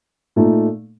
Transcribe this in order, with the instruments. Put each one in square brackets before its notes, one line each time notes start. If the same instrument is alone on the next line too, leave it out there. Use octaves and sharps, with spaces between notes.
[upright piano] A#2 A3 D#4